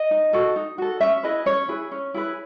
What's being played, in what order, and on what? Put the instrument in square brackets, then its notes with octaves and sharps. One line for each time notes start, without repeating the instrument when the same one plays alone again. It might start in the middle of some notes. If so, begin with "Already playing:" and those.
Already playing: [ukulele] D#5
D#4
F#4 A4
D#4
F#4 A4
C#4 E5
E4 G#4 B4 D#5
C#4 C#5
E4 G#4 B4
C#4
E4 G#4 B4